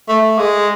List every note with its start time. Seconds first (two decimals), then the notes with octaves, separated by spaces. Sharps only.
0.09 A3
0.39 G#3